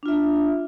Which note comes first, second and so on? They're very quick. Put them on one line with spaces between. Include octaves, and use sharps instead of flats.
D4 F4 E5